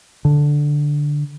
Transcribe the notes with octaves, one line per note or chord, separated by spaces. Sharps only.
D3